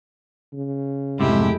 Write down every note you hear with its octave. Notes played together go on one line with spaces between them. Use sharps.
C#3
C2 F2 G#2 C3 G#3 A3 E4 G4